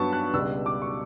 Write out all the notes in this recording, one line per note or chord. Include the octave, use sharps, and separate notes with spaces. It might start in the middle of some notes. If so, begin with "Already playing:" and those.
Already playing: G2 F#3 B3 A5 C#6
F#6
C#2 B2 G3 D4 E6
D6
C#6